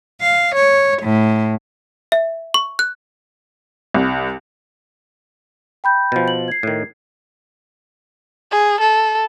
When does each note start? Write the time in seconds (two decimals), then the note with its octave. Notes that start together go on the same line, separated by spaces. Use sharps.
0.21 F5
0.56 C#5
1.02 A2
2.12 E5
2.54 C#6
2.79 F#6
3.94 C2
5.84 G5 B5 G6
6.12 B2 F3
6.28 F#7
6.48 G#6 C7
6.63 A2 D#3
8.51 G#4
8.80 A4